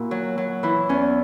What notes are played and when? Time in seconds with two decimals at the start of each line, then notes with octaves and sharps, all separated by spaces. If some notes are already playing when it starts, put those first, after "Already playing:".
Already playing: A#2 A#3 E4 F#4
0.11 F#3
0.38 F#3
0.63 E3 E4
0.89 E2 C#4